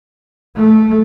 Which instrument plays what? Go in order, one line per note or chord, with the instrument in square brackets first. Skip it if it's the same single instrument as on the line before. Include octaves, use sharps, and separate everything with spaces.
[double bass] A3